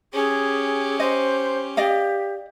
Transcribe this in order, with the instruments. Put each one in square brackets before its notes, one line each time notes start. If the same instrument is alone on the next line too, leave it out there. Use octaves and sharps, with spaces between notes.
[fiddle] C#4 G4 [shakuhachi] G#4
[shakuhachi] C5 [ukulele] D#5
[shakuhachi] G4 [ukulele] D5 D#5 F5